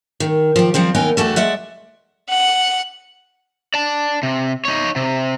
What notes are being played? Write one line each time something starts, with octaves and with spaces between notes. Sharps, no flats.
D#3
F3 G4
F3 G3 C4 C5
D#2 B3 D#4 A#4 G5 G#5
E2 G2 A3 F#4 A5
G#3 D5 E5 F#5
F#5
D5 A5
C3
D#4 C#5
C3